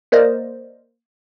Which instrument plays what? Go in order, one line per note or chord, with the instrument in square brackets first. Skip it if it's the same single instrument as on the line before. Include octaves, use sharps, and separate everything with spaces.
[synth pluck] A#3 A#4 C5 D5 D#5